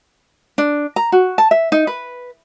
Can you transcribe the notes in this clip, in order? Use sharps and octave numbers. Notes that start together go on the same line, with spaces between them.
D4
A#5
F#4
A5
E5
D#4
B4